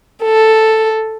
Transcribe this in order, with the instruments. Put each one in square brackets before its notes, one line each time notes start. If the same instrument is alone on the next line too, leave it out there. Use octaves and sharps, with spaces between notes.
[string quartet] A4